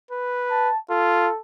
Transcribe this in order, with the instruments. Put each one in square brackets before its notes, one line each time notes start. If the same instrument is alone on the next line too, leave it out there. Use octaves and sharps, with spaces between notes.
[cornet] B4
[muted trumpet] A5
[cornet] F4 [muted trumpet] A4